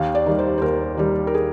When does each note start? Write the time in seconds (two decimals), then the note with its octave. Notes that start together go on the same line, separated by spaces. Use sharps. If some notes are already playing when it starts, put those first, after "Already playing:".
Already playing: D#2 F5
0.15 D5
0.26 D#3 G3
0.39 C5
0.58 C5
0.62 D#2 A#4
0.97 D#3 G3
1.27 A#4
1.34 G#4